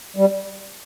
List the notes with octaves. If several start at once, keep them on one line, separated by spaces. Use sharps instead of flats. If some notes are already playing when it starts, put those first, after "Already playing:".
G3